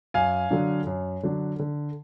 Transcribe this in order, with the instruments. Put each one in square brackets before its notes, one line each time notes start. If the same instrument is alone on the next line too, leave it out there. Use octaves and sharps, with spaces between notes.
[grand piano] F#2 F5 G#5
D3 F#3 D4
F#2
D3 F#3 D4
D3